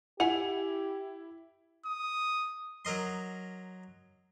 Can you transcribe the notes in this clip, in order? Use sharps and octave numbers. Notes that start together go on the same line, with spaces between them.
E4 G4 F#5 G#5 F7
D#6
F#3 A#4 D#5 C6